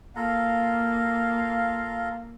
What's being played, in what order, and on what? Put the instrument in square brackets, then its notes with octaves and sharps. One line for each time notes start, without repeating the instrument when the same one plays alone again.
[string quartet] A#3 [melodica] F4 A4 A#5 [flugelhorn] F5